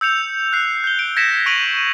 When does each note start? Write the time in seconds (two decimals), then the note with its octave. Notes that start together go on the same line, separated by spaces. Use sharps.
0.01 E6 G6 C#7 F7
0.53 F#6 C7
0.84 G6 G7
0.99 D7
1.16 G#6 A#6 B6 C#7 E7
1.46 C#6 D7 D#7 F7 F#7